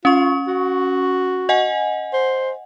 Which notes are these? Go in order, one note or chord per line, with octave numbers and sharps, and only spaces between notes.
C#4 F4 C#6
F#4
D#5 F#5 G#5
C5